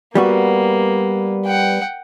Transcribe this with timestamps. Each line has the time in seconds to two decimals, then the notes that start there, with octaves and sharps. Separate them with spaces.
0.15 G3 A#3 B3 F#4
1.45 F#5 G5